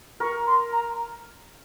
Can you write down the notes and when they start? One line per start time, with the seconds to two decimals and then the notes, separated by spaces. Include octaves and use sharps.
0.20 A#4 C#6
0.47 C6
0.72 A#5